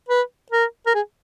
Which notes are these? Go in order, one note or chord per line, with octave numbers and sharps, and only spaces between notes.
B4
A#4
A#4
G#4